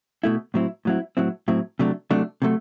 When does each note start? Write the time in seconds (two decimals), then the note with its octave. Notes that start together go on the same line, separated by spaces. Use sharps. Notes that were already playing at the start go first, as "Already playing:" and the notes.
0.24 B2 A3 E4
0.54 A2 F#3 C4 E4
0.85 A2 F#3 C4 E4
1.17 A2 F#3 C4 E4
1.48 A2 F#3 C4 E4
1.79 C3 F#3 A3 D4
2.11 C3 F#3 A3 D4
2.42 C3 F#3 A3